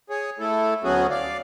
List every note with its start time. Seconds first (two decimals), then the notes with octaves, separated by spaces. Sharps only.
0.10 G#4 C#5
0.39 A3 E4 A4
0.84 D2 F#3 B3 C#4 F#4 G#4
1.10 D5 F5